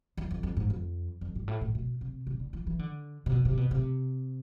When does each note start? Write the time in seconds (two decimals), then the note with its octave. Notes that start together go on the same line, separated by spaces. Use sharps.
0.17 E2
0.31 F2
0.43 F2
0.57 G#2
0.70 F2
1.21 F2
1.36 G#2
1.48 A2
1.61 A2
1.75 B2
2.01 C3
2.27 C3
2.40 D3
2.53 E3
2.67 E3
2.79 D3
3.26 C3
3.32 B2
3.45 C3
3.57 B2
3.71 C3